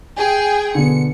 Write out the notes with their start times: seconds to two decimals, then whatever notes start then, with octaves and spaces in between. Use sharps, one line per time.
0.18 G#4 G5
0.75 B2 D3 C#7